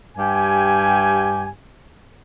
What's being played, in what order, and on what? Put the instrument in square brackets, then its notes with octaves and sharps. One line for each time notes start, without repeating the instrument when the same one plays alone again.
[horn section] G2 G4 G#5